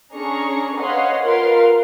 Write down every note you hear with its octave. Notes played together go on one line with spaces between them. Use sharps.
C#4 D4 G#4 A#5 C#6
B4 C#5 D#5 F5 F#5 C6
F4 A#4 B4 F5 C6